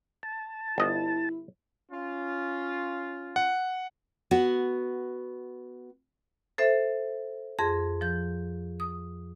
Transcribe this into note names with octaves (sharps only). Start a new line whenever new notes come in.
A5
G1 E4 D#5
C#4 F4
F#5
B3 F#4
A4 C5 E5
F2 G#4 C6 A#6
F3 G6
D#6